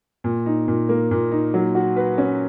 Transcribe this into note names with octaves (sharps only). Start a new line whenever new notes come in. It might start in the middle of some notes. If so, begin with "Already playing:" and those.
A#2
D#4
A#2
A#3
A#2
D#4
F#3
F#4
B4
C#4